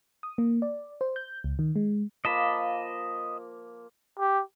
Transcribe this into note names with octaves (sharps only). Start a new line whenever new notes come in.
D#6
A#3
D5
C5
G6
C#2
D#3
G#3
F3 A#3 D#5 A5 B5
G4